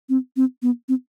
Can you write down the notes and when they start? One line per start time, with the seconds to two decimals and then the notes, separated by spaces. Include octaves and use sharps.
0.09 C4
0.37 C4
0.62 B3
0.89 C4